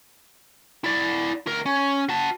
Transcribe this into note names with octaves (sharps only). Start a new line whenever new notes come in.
E4 D5
D2 A#4
C#4
F#4 A5